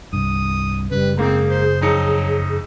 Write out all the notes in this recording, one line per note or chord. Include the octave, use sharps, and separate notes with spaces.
C2 G2 D#6
F#1 C#3 G3 B4
G#2 A#3 C4 D#4 G#4
C5
F2 F#3 D#4 C#7